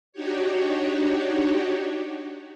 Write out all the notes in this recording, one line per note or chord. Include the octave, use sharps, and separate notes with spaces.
D4 D#4 F#4 G4 C#5